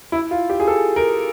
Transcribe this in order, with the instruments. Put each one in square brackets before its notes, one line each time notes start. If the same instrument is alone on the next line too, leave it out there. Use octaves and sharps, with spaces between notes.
[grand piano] E4
F4
G4
G#4
A4
A#4